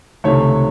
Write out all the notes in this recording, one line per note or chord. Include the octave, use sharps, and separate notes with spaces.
C#2 C3 D#3 A3 C#5